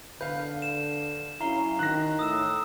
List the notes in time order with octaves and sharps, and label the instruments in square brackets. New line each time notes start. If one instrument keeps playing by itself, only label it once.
[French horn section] D3 [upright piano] B4 F5 [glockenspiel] G6
[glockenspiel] E7
[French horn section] F#3 C#4 E4 [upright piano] F5 [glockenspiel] A#5 C7 G7
[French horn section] D#3 [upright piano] F#6 A#6
[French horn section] A2 [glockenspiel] D#6 E6 E7